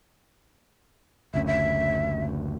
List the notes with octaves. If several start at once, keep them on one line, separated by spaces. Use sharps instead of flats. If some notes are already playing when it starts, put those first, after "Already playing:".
F#1 D2 C#4 E5
E5